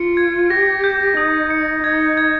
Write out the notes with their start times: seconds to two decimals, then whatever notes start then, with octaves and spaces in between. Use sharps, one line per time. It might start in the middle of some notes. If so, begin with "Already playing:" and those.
Already playing: F4 C#7
0.17 G#6
0.50 G4 A#6
0.84 G6
1.17 D#4 D#6
1.50 C#7
1.83 D#4 G#6
2.17 G#6